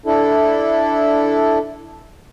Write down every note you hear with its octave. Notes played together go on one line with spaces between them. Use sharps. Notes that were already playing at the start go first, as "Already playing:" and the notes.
D4 E4 A4